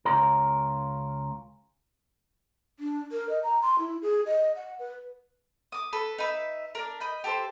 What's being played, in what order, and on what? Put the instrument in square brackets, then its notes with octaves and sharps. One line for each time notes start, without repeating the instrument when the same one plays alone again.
[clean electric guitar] C#2 C#4 F4 A#4
[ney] D4
A#4
D#5
A#5
C6
E4
G#4
D#5
F#5
B4
[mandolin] D6 D#6
A4 B4
D#4 B4 E5
D4 A#4
D#5 B5 G6
G4 A4 B4 C5